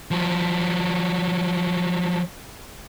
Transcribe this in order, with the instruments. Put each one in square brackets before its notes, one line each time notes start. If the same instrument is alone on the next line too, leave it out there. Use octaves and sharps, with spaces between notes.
[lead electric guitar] F3 F#3